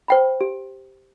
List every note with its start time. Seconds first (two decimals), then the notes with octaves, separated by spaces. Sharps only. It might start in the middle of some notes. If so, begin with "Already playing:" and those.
0.08 C5 G5 B5
0.41 G4